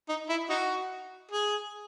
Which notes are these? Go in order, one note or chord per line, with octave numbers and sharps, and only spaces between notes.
D#4
E4
D#4 F#4
G#4